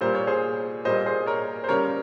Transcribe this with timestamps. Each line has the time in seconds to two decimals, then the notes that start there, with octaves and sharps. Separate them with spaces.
0.01 A#2 G3 A#3 C5
0.15 C#5
0.27 G#4 C5
0.85 A#2 G3 A#3 C5 D#5
1.06 G#4 C5
1.26 A#4 C#5
1.64 C5
1.69 C#3 G3 A#3 A#4 C#5